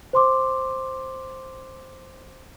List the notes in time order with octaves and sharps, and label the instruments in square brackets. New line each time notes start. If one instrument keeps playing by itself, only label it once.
[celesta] C5 C6 D6